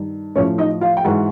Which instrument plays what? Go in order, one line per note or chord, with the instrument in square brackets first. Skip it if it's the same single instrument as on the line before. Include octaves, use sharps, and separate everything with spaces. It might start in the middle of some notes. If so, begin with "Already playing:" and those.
Already playing: [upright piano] G2 D#3
A2 F3 C#4 C#5
D#4 D#5
F4 F5
G5
G#2 E3 F#4 F#5